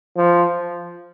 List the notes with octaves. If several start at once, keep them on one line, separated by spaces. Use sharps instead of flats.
F3